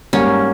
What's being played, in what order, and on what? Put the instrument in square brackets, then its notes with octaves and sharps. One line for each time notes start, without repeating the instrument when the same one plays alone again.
[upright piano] G#2 G3 A#3 [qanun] C#4